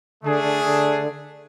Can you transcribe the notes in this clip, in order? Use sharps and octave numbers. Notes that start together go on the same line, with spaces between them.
D3 A3 D4 G#4
D3
D3